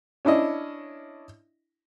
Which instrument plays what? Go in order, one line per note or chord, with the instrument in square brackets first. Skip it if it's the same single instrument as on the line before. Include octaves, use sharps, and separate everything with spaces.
[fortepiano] C#4 D4 E4 D#5